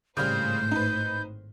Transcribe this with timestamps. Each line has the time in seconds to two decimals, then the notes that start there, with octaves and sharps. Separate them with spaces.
0.17 G#1 A2 C#3 G3 C5 F6 G6
0.71 D#4 B4